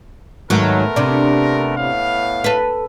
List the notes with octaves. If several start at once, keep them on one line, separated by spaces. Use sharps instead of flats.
G#2 D#3 F#3 A3 B3 A#4
C3 D4
A2 B3 F5
A4 B4